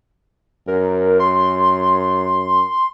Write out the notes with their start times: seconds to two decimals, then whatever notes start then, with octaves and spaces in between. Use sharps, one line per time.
0.68 F#2 A#4
1.20 C6